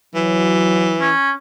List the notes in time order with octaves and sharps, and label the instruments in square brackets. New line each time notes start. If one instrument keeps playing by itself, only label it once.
[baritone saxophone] E3 [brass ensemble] F#3
[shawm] C#4